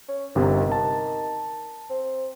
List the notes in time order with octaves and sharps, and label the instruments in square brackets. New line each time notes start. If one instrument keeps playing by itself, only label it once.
[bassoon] C#4
[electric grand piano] G1 C3 [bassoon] D#3
[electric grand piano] A5
[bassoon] C4